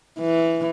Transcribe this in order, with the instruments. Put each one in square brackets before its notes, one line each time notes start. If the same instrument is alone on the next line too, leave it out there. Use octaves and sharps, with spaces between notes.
[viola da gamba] E3